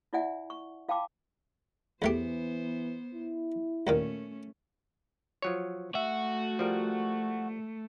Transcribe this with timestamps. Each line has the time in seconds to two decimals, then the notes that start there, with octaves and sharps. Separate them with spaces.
0.13 E4 F4 D5 E5 F#5 G#5
0.50 C#6
0.88 F4 F5 G5 A5 B5 D6
2.02 E2 E3 A3 B3 G4 C5
3.14 E4
3.87 D#2 A#2 D#3 A3 C#4
5.42 F3 F#3 C#5
5.95 A3 F#4 E5
6.59 F3 G3 A#4